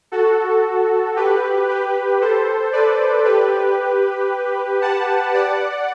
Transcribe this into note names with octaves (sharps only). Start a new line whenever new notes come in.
F#4 A4
G4 B4
G4 B4
A4 C5
B4 D5
G4 B4
F#5 A5
D5 F#5